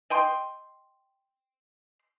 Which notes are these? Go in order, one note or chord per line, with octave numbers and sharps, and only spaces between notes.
D#5 G5 C6